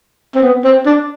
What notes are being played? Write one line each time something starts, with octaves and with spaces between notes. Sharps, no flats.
C4
B3
C4
D4